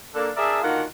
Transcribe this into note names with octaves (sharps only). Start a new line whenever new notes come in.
A#3 D4 A4
D4 G#4 A#4 D5 E5
D3 D#3 A#3 F4 F#4 F#5